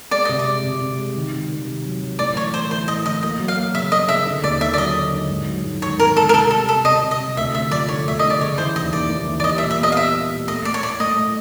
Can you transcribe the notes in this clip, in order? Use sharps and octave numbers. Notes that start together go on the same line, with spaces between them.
G#3 D5
C3 D#5
D5
G#3
C3
C3
G#3
D#3
C3
D#3
C3
F#3
F#3
A2 D5
E3 C#5
A2 C5
E3 C5
A2 D#5
E3 D#5
A#3 D#5
F#3
F5
A#3
C#3 E5
A#3 D#5
C#3 E5
D3
D#2 D5
D3 E5
D5
F#3 D#5
D3
D3
G#2
F#3
G#2
D#3 C#5
G#2 A#4
D#3 A4
A#4
C3 A4
G3 A4
C3 A4
C3 D#5
C3
D#5
C3
D2 E5
D3 E5
F3 D5
D3 C#5
D2 E5
D3 D#5
D5
C#3 C#5
E3 C5
D#2 D#5
D#2 D5
D#2
E3
D5
G3 D#5
E5
A#2
E5
B3 D#5
F5
G3 E5
G3
A#2
A3 D#5
A3 D5
C#5
A2 D5
A3 D#5
A2